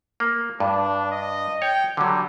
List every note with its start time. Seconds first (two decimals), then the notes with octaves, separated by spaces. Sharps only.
0.20 A#3
0.60 G2 D4
1.12 D#5
1.62 C#5 G5
1.97 D3 F#3 G3